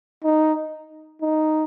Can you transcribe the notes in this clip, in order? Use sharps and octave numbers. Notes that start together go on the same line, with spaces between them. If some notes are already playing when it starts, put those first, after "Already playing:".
D#4
D#4